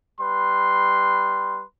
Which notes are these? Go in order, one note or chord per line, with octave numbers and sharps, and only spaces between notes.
G3 B4 C6